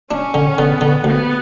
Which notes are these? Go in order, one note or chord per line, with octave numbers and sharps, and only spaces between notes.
C#4 D4
D3
D3 B3
D3
D2 B3